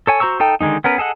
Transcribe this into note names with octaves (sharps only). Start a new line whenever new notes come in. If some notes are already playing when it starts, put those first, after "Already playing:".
A4 C#5 G#5
F#4 C5 A#5 C#6 E6
D#4 A4 G5
D3 D#3 G#3 A3 D#4
B3 C#4 A#4 B4
G#4 A4 D#5 F#5